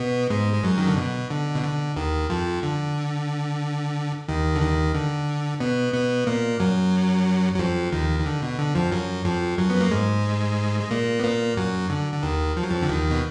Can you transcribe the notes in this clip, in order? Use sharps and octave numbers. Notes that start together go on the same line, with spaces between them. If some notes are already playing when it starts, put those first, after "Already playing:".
Already playing: B2 B3
G#2 G#3
G#3
F#2 F#3
D#3
D3
B2
D3
B2
D3
D#2 D#3
F2 F3
D3
D#2 D#3
D3
D#2 D#3
D3
B2 B3
B2 B3
A#2 A#3
F#2 F#3
F#3
F2 F3
D#2 D#3
D#3
D3
B2
D3
F2 F3
F#2 F#3
F2 F3
F#2 F#3
B3
A#3
G#2 G#3
G#3
A#2 A#3
B3
A#2 A#3
F#2 F#3
D3
D3
D#2 D#3
F3
F#3
F2 F3
D3
D#2 D#3
B2